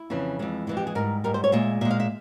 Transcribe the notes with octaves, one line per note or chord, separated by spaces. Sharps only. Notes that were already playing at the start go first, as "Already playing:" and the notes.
Already playing: E4
F2 C#3 E3
F2 E3 G#3
F2 E3 G#3 E4
G4
G#4
G#2 G3 A#4
G#2 G3 A#4
C5
C#5
A#2 G#3 E5
A#2 G#3 E5
F5
E5